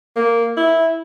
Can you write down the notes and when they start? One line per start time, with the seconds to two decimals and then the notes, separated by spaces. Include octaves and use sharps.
0.16 A#3
0.57 E4